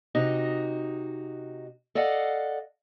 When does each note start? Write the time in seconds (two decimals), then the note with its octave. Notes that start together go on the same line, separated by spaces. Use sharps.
0.15 C3 D#4 F#4 D#5
1.95 A4 D5 D#5 F5 F#5